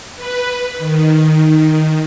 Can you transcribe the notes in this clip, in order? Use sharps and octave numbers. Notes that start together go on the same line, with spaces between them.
B4
D#3